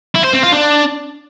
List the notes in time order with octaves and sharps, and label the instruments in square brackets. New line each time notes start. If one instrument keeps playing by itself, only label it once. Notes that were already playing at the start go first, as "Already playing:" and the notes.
[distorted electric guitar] E4
C5
C4
F4
D4